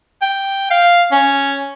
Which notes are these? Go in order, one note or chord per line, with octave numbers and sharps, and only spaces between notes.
G5
F5
C#4